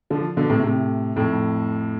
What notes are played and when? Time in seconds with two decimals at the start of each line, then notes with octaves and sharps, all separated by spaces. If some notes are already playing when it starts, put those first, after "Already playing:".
0.10 D3 F3
0.37 B2 D3
0.50 A2 C3
0.63 A2 C3
1.16 F2 A2